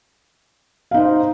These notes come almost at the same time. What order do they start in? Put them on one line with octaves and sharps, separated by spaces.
F5 D#4 C5